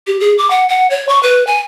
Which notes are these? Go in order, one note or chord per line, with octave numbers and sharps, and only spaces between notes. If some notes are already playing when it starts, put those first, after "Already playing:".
G4
G#4
D6
F#5
F#5
C#5
C#6
B4
G#5